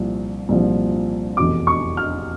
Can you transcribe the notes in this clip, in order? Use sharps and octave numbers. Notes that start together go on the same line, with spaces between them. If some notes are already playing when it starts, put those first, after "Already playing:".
Already playing: C2 A#2 F3
C2 A#2 F3
F1 E2 B2 D6
C#6
F6